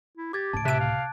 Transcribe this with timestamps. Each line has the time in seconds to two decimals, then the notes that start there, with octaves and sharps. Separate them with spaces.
0.17 E4
0.33 G4 D6 G#6 A6
0.53 C#2 A2 A5 D7
0.65 C3 E5 A5 F#6 D7
0.80 F5